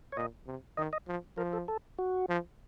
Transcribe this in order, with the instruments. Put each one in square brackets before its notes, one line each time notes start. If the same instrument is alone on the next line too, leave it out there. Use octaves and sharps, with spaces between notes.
[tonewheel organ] C#5
[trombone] A#2 [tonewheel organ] D#5
[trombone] C3
[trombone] D#3 [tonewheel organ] D#5
[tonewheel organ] D#5
[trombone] F3
[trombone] F3 [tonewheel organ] A#4
[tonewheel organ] A4
A4
F#4
[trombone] F3